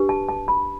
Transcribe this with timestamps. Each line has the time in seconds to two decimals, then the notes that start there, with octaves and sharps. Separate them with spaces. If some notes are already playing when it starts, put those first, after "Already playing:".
Already playing: D4 G4 B4
0.09 A5
0.29 A5
0.48 B5